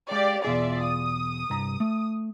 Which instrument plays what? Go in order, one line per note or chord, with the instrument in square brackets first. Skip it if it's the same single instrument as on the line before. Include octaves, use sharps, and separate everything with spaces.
[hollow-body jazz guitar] G#3 [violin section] G4 D5 F5
[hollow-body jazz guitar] E2 B2 G#4 [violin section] F4 D5 E5
[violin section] D#6
[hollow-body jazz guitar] C2 G2 A#5
A3